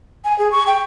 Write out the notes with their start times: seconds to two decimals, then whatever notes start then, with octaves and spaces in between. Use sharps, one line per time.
0.24 G#5
0.38 G#4
0.51 C#6
0.66 G5